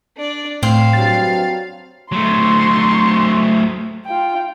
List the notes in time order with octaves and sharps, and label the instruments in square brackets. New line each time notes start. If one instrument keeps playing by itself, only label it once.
[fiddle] D4 D5
[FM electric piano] A2 [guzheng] C4 [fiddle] F5
[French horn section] G2 F#3 [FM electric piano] A6
[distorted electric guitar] F#3 A3 [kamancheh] C6 C#6
[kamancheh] F4 G5